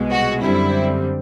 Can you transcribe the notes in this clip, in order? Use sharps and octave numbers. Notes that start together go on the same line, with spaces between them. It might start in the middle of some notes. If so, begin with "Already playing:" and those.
Already playing: C2 B2 G#3 B3
F#4
F#2 D3 G3 C4 E4